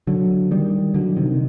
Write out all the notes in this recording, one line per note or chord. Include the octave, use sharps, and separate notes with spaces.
D3 F#3
D#3 G3
D3 F#3
C3 D#3